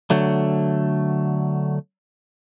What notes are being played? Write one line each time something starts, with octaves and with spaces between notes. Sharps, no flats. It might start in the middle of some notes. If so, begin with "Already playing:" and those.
D3 F#3 A3